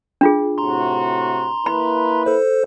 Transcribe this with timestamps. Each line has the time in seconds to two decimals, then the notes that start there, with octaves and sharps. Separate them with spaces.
0.21 D4 F4 G#4
0.58 A2 C3 F#4 A#5 C6
1.66 A#3 E4 B4 B5
2.26 A4 C5